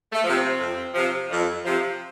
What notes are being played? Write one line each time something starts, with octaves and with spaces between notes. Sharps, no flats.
A3
C3 F3
C4
F2
C3 F3
F2
C3 F3